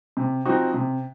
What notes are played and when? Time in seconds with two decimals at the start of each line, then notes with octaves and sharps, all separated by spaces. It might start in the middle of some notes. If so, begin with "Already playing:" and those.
0.17 C3
0.46 F3 C4 D#4 F#4
0.74 C3